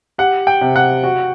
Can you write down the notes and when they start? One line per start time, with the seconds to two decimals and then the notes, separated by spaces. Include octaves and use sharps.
0.18 G4 F#5
0.47 G5
0.61 C3
0.76 F#5
1.04 F#4